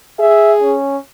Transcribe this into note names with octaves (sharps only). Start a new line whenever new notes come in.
G#4 E5
C#4